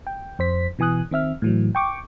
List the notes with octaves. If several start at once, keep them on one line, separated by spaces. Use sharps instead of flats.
G5
F2 C5 B6
B2 E3 G#5 D#6 F#6
D#3 C4 E5 F6
A2 E3 F#3
G5 C#6 D6